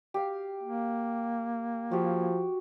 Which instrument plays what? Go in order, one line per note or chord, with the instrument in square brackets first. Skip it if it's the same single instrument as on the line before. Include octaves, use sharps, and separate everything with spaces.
[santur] G4 F5
[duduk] A#3
[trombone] F3 [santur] F#4 G4